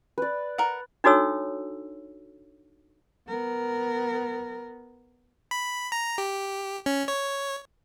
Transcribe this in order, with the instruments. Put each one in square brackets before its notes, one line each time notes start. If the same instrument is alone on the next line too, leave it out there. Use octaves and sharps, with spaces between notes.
[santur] B4 D5
[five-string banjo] A#4 F#5
[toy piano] D4 D#4 F#4 A4 C#5 E6
[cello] B3 A#4
[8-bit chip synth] B5
A#5
G4
C#4
C#5